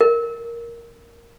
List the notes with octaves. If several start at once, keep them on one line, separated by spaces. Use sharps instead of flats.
A#4